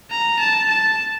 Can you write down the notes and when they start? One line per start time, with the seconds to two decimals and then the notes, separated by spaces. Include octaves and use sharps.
0.11 A#5
0.39 A5
0.69 A5